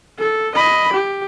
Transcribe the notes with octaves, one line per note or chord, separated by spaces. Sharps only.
A4
D#5 B5
G4